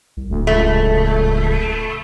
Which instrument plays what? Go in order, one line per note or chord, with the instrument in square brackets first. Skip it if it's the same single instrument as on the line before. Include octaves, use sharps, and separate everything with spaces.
[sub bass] C2
[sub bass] D1 [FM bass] D2
[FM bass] C#2 [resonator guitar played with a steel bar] A3